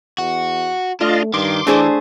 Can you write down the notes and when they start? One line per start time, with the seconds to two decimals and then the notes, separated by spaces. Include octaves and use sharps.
0.18 E2 F#4
1.01 A3 D4 F4 D#5 F5
1.34 G2 D#3 C6 D6
1.67 E3 A3 D4 G#4 C5